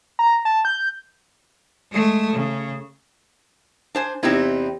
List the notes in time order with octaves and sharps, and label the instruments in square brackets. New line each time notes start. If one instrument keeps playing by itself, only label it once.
[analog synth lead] A#5
A5
G6
[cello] G#3 A3
C#3
[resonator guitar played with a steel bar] D4 C5 G#5
[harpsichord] E2 C3 [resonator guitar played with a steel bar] C4 D#4 E4